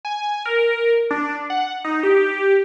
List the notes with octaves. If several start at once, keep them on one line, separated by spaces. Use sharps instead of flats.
G#5
A#4
D4
F#5
D#4
G4